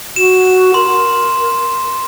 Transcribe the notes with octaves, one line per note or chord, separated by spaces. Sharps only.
F#4 E7
A#4 C6